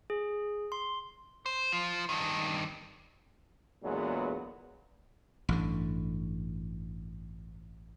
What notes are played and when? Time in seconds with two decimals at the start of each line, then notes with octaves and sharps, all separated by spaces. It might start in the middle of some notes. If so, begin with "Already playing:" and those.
0.10 G#4
0.72 C6
1.46 C5
1.72 F3
2.09 G2 D#3
3.83 E2 A#2 D3 F#3 G#3 B3
5.49 A1 G2 D3